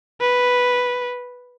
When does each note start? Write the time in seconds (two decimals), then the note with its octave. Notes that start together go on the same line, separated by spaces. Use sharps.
0.21 B4